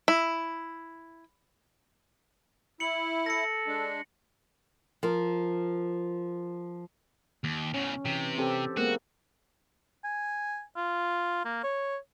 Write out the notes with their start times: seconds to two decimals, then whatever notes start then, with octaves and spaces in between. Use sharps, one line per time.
0.08 E4
2.80 E4 C#7 F#7
3.26 A4 A#6 C#7
3.67 G#3 D4
5.03 F3 A#4
7.44 D#2
7.74 E2 C#3 C#4
8.05 C3 E3
8.38 C4 G4 A4
8.77 G#3 A#3 B3 F#4
10.04 G#5
10.77 F4
11.45 A#3
11.64 C#5